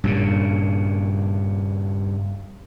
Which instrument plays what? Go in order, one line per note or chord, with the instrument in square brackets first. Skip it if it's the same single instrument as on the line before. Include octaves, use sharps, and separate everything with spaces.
[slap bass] G2 A#2 C#3